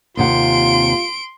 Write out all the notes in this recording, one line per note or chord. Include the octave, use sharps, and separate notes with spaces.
D#2 C3 F4 F#5 C6 D7